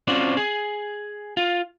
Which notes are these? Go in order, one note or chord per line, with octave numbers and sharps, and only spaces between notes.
C4 C#4 F4 F#4 C5 D5
G#4
F4